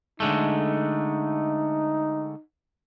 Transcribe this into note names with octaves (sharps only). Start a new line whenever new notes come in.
D3 G#3 A3 D#4